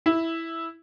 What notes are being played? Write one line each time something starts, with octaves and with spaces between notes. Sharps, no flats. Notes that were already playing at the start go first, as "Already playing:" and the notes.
E4